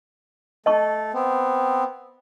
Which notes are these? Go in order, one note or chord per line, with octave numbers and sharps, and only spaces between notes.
A3 D#5 A5 C#6
B3 C4